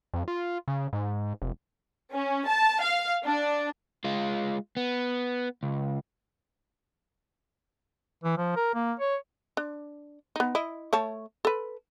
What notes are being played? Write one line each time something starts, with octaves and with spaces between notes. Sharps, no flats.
F2
F4
C#3
G#2
F1
C#4
A5
F5
D4
G#3 F4
B3
C#2
E3
F3
A#4
A#3
C#5
D4
B3 D#4
E4 D#5
A3 C#5 A5
A4 B4